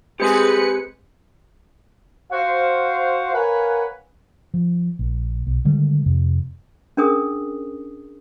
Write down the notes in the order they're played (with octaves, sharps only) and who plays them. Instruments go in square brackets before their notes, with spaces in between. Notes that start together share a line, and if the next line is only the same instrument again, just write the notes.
[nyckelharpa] G#3 C4 [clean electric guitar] G4 G#4 G#5 [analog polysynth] B4 C#7
[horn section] F#4 C5 F5
A#4 B4 C#5 F5 F#5 G#5
[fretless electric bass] F3
A#1
B1
D3 D#3 G3 G#3
F2 C3
[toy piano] C#4 D4 G#4 A#4 D#6